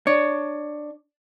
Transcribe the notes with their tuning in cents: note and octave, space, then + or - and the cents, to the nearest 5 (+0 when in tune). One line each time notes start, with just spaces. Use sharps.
D4 +15 C#5 +10